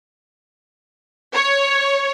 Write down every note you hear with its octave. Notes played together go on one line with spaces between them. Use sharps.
C#5